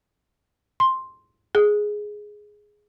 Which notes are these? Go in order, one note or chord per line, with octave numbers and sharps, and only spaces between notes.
C6
G#4